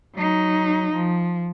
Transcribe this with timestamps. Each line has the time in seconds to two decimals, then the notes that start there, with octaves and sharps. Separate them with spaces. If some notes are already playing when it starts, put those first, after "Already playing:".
0.15 F#3 D#4
0.94 F3